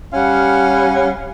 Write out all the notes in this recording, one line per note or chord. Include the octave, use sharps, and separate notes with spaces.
G3 C#4 F5 F#5